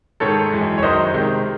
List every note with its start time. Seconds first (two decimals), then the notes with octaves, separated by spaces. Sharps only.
0.20 G#2 D#3 G#3 A4 C#5
0.52 F#2 E3 G#3
0.78 C#5
0.83 F#2 D#3 F#3 C5 D#5
1.14 C3 D#3 G#3